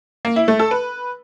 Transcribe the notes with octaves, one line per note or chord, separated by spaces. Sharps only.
A#3
E4
A3
A4
B4